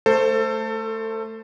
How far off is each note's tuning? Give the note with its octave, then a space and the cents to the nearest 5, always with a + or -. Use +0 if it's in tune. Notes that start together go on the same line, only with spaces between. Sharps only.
A3 +0 A4 +25 C5 +0